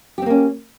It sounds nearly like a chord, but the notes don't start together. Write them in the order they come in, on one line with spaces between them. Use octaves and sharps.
G4 C4 A#3 C#4